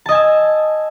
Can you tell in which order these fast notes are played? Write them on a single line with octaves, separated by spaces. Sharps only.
A5 D#5 G#5 E6